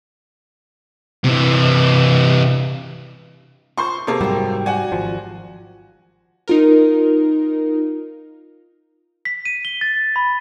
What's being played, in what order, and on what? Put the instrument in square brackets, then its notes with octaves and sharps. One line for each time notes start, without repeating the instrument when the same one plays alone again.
[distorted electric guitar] C3 E3
[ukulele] F4 C5 [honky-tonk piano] C6 C#6
[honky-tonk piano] C3 A#3 [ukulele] G#4 A4
[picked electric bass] G#2 F#3 G3 [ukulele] C5 G5
[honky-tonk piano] F#4 G#5 [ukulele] D5
[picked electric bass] G#1 F3
[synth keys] D#4 F4 A#4
[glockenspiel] B6
D#7
G7
A6
B5